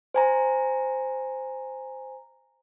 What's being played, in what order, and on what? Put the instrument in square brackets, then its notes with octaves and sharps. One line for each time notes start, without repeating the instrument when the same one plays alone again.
[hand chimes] C5 G#5 A#5